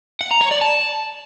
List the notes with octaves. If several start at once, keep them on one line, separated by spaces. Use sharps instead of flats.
F#5
A#5
C#5
D5
A5